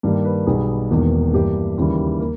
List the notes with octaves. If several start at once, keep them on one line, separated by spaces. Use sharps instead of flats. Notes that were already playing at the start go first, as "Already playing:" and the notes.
G2 D#3 G3 A#3
B4
B1 B2 G3 B3 G#4
E1 E2 D#3 A#3
G2 E3 A#3 G4
D#2 C#3 E3 G3
A#3 A#4